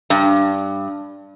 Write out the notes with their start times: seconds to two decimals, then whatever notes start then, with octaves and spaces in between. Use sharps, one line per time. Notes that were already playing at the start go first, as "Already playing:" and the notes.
0.10 G2